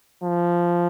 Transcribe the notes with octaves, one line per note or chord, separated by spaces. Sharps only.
F3